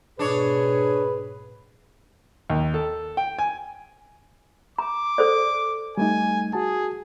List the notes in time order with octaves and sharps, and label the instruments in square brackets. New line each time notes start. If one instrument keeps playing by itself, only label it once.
[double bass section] G#2 B2 [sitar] D4 C#5 [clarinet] G#4 [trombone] B4
[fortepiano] D#2
A4
G5
G#5
[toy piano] A#5 [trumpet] D6
[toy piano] A4 C5 D5
[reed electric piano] G3 A3 D#4 [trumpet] G#5
[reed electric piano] F#4 A5 [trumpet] G#4